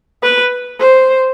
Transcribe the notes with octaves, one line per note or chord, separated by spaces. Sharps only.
B4
C5